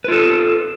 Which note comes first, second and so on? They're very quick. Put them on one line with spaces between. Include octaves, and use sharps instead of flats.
B4 F4 A4